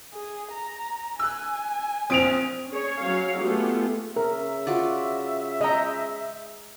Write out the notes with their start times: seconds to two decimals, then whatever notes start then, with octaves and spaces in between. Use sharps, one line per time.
0.13 G#4
0.52 A#5
1.19 G#5 E6 F#6
2.10 A#1 C4 D#6 D7 F7
2.70 C#4 G#4 C#5
3.00 F#3 C#4 C#5 F5
3.39 A3 B3 F4 G4 G#4
4.16 C#3 A#4 E5
4.67 F4 F#4 D5
5.61 G#3 D#5 G5 A#5